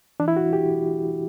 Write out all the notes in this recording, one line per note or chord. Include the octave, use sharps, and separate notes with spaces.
E3 D4
E4
F#4
G4